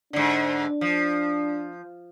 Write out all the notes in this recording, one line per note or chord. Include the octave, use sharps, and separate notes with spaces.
G#2 D3 D4
F3